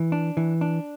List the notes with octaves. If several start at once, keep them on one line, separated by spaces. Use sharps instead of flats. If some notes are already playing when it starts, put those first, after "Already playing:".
Already playing: E3
D4
E3
D4